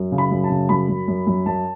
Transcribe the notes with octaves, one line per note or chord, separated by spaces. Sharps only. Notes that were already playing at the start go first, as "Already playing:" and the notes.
Already playing: F#2
C#3
B5
F#2
A5
C#3
F#2 B5
F#2
F#2
F#2
F#2 A5